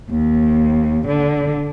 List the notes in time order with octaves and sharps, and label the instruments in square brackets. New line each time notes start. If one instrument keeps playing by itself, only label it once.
[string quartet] D#2
D3